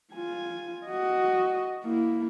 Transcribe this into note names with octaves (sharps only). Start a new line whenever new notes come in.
F4 G#5
F#4 D#5
A#3 E4